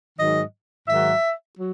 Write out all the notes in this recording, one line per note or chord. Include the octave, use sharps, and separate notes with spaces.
G#2 D#3 F#3 D#5
G#2 D#3 F#3 E5
F#3